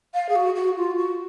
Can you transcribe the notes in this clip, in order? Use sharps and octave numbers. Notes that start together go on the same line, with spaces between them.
F5
G#4
F#4
F#4
F4
F#4